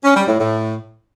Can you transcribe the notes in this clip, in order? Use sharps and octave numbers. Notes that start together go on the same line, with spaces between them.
C#4
G3
A2
A2